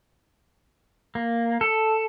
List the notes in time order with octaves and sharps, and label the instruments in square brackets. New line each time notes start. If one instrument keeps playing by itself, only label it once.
[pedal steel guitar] A#3
A4